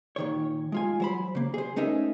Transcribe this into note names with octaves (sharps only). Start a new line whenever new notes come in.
A#2 D#3 C#5
G#3 F4 G#5
F#3 C5 B5
C#3 A#3
G#4 C5
A3 C#4 D#4 A#4 D#5 E5